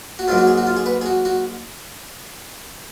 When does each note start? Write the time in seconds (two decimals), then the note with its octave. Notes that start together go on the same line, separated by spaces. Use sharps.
0.19 F#4
0.28 G#2 F#3 A#3 F4
0.38 F#4
0.47 G#4
0.58 F#4
0.67 F4
0.77 G#4
0.86 B4
1.01 G#4
1.06 F#4
1.25 F#4